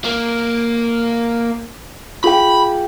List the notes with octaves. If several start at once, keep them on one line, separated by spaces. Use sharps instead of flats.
A#3
F4 G#4 G5 B5